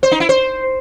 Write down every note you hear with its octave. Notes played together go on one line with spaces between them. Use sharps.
C5
D#4
E4
C5